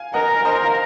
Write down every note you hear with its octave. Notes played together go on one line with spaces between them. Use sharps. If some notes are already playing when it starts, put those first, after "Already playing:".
Already playing: F5 G#5
A#4 D#5 F#5
A#4 C5 D#5
F5